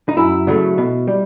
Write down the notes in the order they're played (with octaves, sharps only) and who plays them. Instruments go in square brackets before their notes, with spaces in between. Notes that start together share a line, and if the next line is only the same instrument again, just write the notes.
[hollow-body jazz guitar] D#4
F#2 E4
C#3 F#3 A3
B2
G3